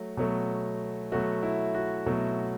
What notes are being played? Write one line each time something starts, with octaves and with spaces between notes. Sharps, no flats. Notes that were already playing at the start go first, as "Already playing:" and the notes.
Already playing: F#3 A3
B2 F#3 A3
B2 F#3 A3 F#4
E4
F#4
B2 F#3 A3